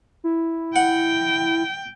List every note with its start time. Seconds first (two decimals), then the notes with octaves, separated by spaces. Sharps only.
0.24 E4
0.76 F#5 G5